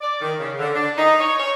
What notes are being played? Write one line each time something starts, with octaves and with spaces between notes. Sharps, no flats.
D5
D#3
C#3
D3
D4
D#4
C#5
C#5